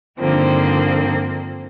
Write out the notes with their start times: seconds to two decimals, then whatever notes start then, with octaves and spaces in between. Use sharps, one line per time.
0.20 G2 D3 D#3 F3 A#3 C4